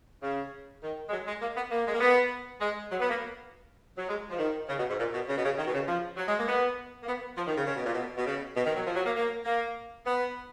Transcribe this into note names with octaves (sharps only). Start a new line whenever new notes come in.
C#3
D#3
G#3
F#3
G#3
A#3
B3
A#3
G#3
A#3
B3
G#3
F#3
B3
A#3
F#3
G#3
F3
D#3
C#3
B2
G#2
A#2
B2
C#3
B2
C#3
D#3
B2
C#3
F3
F#3
G#3
A#3
B3
A#3
B3
F3
D#3
C#3
C#3
B2
A#2
B2
B2
C#3
B2
D#3
F#3
F3
F#3
A#3
A#3
A#3
B3